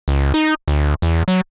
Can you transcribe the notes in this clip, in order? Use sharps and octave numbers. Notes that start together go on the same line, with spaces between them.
C#2
D#4
D2
E2
F#3